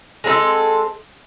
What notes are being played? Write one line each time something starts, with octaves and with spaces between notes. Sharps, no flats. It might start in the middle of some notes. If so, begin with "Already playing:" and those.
G#3 C4 E4 A4